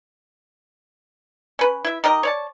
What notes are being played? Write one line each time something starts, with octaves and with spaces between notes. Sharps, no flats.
C#4 B4
E4 E5
D#4 G4 A#4 D#5
C#5 D5 A5